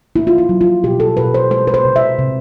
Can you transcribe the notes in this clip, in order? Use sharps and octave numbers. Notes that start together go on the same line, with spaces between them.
A#3 E4
F4
E4
F#3
F4
B2 G4
A4
B2 B4
C5
G#3 C5
B4
C5
C3
E5
C3